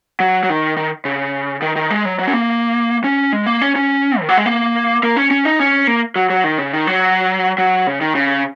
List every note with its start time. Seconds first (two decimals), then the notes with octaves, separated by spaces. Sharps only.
0.20 F#3
0.43 F#3
0.50 D#3
0.77 D#3
1.05 C#3
1.62 D#3
1.76 D#3
1.90 G#3
2.05 F#3
2.19 F#3
2.27 C#4
2.33 A#3
3.04 C#4
3.33 G#3
3.46 A#3
3.62 C#4
3.76 C#4
4.21 D#3
4.29 F#3
4.37 G#3
4.46 A#3
5.03 A#3
5.16 C#4
5.31 C#4
5.45 D#4
5.60 C#4
5.87 A#3
6.16 F#3
6.30 F#3
6.44 D#3
6.58 C#3
6.73 D#3
6.87 F#3
7.58 F#3
7.87 C#3
8.01 D#3
8.15 C#3